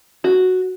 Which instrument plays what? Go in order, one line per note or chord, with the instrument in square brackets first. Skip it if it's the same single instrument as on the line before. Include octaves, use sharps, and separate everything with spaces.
[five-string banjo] F#4